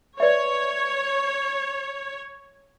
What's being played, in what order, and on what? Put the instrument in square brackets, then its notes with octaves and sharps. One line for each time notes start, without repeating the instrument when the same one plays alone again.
[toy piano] B4 D5 E5 [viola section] C#5